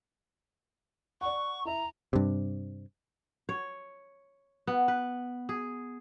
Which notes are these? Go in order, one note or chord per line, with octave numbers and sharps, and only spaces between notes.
D5 F#5 C#6
E4 E5 A#5
G2 C3
C#5
B3
B4
G#4